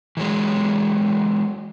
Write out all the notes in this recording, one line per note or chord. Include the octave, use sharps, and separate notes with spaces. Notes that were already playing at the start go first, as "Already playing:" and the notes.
E3 F#3 G#3